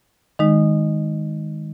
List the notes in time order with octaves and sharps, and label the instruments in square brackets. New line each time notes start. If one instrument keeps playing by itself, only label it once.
[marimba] D#3 G#3 D#4